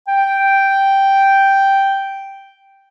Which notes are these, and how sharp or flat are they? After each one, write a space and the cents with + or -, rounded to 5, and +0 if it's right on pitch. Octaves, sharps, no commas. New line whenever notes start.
G5 -5